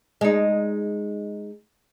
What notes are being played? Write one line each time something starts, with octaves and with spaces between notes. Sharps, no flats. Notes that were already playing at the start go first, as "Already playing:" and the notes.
G#3 D#4